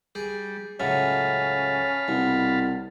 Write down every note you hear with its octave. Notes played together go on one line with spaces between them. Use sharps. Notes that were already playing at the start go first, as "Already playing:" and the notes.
G3 G#4
C#2 A2 F#3 C#4 F5 A5 B5
C2 B2